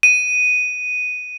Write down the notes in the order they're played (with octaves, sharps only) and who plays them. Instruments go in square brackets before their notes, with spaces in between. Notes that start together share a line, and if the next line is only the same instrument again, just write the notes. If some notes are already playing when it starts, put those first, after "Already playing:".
[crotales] D#7